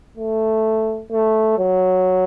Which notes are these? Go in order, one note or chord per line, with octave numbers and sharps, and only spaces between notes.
A3
A3
F#3